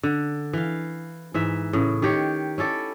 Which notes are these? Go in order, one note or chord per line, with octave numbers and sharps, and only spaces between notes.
D3
E3 F5
G#2 E3 E5
A2 C#3
D#3 G4 C#5
C#4 E4 A4 D5